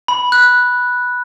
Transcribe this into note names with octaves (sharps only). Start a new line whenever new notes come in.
B5
F#6